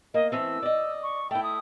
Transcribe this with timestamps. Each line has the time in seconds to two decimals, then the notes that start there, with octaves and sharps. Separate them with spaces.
0.14 A#3 D#5
0.32 E3 A3 C4 E6
0.62 D5 D#5
1.03 C#6
1.31 A3 E4 G5
1.43 D#6